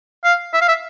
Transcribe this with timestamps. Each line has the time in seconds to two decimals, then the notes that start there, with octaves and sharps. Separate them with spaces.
0.24 F5
0.53 E5
0.61 F5
0.68 E5